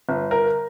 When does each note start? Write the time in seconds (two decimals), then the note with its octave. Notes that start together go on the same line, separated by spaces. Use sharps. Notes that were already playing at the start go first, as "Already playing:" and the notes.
0.09 G1
0.31 A#4